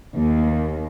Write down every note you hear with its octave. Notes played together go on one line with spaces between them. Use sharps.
D#2